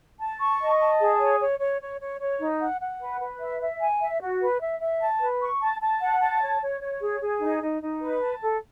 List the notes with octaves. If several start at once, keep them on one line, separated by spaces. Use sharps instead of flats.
A5
C#6
D#5
A5
G#4
C#5
C#5
C#5
C#5
C#5
C#5
D#4
F#5
F#5
B4
B4
E5
E5
G#5
E5
F#4
B4
E5
E5
A5
B4
C#6
A5
A5
F#5
A5
C#5
C#5
C#5
G#4
G#4
D#4
D#4
D#4
B4
A5
A4